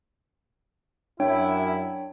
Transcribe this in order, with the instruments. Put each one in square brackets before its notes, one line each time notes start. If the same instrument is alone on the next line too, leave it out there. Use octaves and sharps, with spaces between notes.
[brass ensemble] F#2 E4 [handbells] D4 C#5 G5